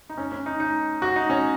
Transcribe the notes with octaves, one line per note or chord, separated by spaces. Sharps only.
D#4
C#4
C#4
D#4
D#4
F#4
D#4
C#4